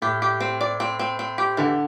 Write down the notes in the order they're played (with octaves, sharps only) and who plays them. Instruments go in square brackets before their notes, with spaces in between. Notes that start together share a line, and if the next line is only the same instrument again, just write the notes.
[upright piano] A2 [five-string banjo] G4
[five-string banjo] G4
C4
D5
C4
C4
C4
G4
[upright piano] D3 [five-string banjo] E3